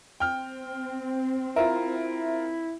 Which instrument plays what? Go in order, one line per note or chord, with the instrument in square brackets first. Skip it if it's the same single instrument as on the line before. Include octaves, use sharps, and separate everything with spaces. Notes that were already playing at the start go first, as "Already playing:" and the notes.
[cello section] C4 [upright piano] G5 F6
[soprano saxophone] E4 [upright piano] F4 A#4 [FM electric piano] E5